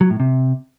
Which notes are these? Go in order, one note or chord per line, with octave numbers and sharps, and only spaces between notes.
F#3
A2
C3